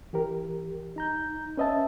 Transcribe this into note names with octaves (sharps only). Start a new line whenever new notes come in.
E3 G4 A#4
D#4 A#5 G6
C#4 B4 D#5 E5 A5